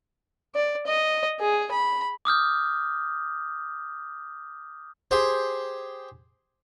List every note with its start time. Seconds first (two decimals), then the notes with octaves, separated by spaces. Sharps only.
0.55 D5
0.87 D#5
1.41 G#4
1.71 B5
2.25 D6 D#6 F6 G6
5.11 G4 G#4 C5